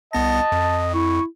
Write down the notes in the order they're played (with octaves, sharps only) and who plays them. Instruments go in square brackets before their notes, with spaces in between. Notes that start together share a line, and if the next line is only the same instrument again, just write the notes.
[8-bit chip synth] C2 B3 A#6 [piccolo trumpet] D#5 [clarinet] A5
[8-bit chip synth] F2
[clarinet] E4 [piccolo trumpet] C#6